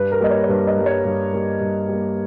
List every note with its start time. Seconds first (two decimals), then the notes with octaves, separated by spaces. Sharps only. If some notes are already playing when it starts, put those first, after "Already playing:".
Already playing: G2 B4
0.12 A#4
0.21 G3 A#3 D#5
0.31 C#5
0.44 C#5
0.49 G2 B4
0.67 D#5
0.77 G3 A#3
0.86 C#5
1.05 G2
1.33 G3 A#3
1.60 G2
1.88 G3 A#3